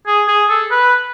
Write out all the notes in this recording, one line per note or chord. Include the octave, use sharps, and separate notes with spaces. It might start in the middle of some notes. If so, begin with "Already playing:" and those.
G#4
G#4
A4
B4